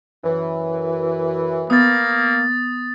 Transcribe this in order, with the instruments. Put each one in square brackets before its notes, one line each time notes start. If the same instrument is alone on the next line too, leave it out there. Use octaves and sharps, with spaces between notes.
[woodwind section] F#2 E3
[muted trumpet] A#3 [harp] B3 [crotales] D#6 A6